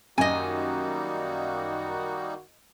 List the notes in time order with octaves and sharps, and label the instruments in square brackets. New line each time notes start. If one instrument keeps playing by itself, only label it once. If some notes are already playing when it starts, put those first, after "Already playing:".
[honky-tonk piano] F#2 [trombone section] D#3 F#4 [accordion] G3 A#3 D#4 [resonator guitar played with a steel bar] D#5 G#5